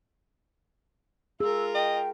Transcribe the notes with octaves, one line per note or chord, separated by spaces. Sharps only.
F4 G#4 A#4 E6
D#5 G5